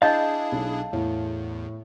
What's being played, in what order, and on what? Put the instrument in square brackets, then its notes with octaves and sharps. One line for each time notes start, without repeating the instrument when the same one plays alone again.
[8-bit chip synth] D4 E4 G#4 [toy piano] D#5 [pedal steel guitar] F5 A5 G6
[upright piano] B1
[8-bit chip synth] E2 [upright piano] A2